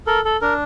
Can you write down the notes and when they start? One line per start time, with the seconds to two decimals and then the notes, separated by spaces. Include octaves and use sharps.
0.07 A4 A#4
0.25 A4
0.41 D4 A#4